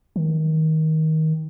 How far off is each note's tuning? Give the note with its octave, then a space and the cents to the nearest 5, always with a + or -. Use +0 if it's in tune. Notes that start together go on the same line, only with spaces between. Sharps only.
D#3 +20